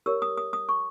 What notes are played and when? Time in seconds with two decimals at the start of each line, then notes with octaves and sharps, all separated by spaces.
0.06 G4 A#4 C#5 E6
0.22 D#6
0.37 D#6
0.53 D#6
0.69 C#6